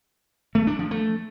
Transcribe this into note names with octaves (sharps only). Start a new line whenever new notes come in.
A3
D4
F3
A3